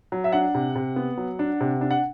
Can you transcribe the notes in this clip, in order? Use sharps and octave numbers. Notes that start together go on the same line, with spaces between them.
F#3
E5
D4 F#5
C3
C3
B3
F#3
D4
C3
D4
F#5